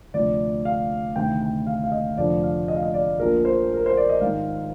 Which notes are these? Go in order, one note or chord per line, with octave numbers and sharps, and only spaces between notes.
D2 C3 F3 D5
F5
D2 C3 D#3 G5
G5
F5
F5
D#5
F1 F2 D3 F3 D5
F5
D#5
F5
D#5
D5
A#1 A#2 F3 A#4
C5
A#4
C5
D5
D#5
G#1 G#2 D#3 F5